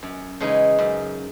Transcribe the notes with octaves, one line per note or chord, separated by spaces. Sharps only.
F#2
C#3 E3 G#3 D#4
F#2